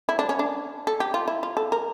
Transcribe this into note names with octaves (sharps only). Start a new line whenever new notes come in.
E4
D4
C#4
D4
A4
G4
F4
E4
F4
A4
A#4